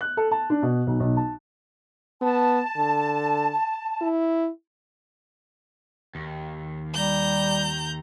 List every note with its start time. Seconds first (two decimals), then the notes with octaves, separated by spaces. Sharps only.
0.01 F#6
0.17 A4
0.31 A5
0.50 D4
0.62 B2
0.87 B1
1.00 B1
1.17 A5
2.22 B3 A5
2.77 D3
4.02 E4
6.15 D#2
6.94 G3 A#5 G6